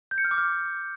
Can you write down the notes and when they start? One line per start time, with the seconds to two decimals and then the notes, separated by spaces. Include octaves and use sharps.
0.11 G6
0.18 C#7
0.25 F6
0.31 D6
0.38 F6